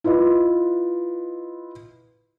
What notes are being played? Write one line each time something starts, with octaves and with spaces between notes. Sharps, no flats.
E4 F4 B4 D#5